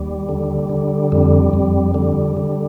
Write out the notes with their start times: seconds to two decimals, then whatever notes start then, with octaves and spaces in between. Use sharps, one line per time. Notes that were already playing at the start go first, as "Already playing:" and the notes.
Already playing: D#2 G3
0.29 D3
0.70 D3
1.12 F2 G3
1.53 F2 G3
1.94 D3 G3
2.37 D3